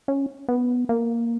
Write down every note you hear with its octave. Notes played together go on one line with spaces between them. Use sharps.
C#4
B3
A#3